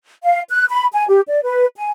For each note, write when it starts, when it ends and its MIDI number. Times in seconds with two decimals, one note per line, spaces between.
0.23 0.40 77
0.50 0.65 90
0.69 0.86 83
0.93 1.05 80
1.07 1.21 67
1.28 1.40 74
1.42 1.66 71
1.76 1.91 80